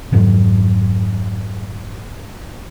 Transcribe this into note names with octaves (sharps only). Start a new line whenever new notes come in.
F2 G#2 D#3 F#3